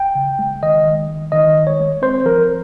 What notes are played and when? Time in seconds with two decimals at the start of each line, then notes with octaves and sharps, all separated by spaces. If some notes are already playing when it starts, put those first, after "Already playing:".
Already playing: G5
0.15 C#3
0.39 G#3
0.63 D#3 D#5
0.85 D#3
1.08 G#3
1.32 D#3 D#5
1.55 D#3
1.67 C#5
1.80 G#3
2.02 C4 C5
2.26 F3 A#4